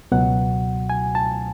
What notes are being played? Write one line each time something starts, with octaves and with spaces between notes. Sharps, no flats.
C#2 B2 F#3 F#5
G#5
A5